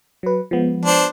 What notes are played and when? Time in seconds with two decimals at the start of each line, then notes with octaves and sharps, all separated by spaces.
0.23 F#3 B4
0.51 F3 G#3 B3
0.86 D4 C5